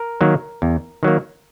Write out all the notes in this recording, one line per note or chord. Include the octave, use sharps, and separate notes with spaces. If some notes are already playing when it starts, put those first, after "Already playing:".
Already playing: A#4
D#3 F#3 A#3
E2
D#3 F#3 A#3